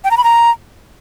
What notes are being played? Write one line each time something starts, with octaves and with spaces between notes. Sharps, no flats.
G5
A#5
B5
A#5